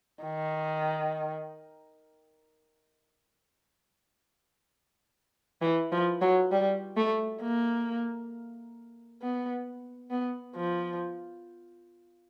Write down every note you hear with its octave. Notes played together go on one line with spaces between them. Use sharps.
D#3
E3
F3
F#3
G3
A3
A#3
B3
B3
F3